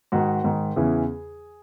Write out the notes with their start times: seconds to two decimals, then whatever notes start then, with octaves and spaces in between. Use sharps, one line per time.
0.12 G#2 D#3 F#4
0.44 G#2 D#3
0.76 E2 C#3 E3 G#4